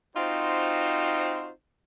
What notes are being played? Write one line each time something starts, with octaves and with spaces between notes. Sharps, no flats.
C4 D#4 F4 F#4 C5